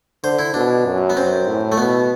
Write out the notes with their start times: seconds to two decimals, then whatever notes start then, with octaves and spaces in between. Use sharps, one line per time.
0.24 D3 C5
0.39 E4
0.54 B2 D4
0.86 F#2
1.10 B3
1.16 F#2 C4
1.47 A2
1.72 A3
1.77 B2 B3